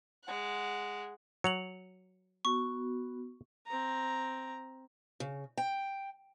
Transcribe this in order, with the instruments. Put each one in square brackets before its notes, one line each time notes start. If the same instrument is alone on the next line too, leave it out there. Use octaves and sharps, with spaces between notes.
[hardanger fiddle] G#3 F#5
[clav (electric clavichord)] F#3 [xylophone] C#7 F7 F#7
[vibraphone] B3 F#4 [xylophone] C#6
[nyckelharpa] C4 A#5
[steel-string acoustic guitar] C#3
G5